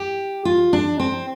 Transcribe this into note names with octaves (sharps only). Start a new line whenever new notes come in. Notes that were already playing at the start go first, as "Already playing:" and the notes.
Already playing: G4
F4
D4
C4